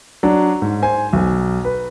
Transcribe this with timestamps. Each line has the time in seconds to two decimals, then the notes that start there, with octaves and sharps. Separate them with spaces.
0.23 F#3 D4
0.62 G#2
0.82 C5 G#5
1.13 B1
1.65 B4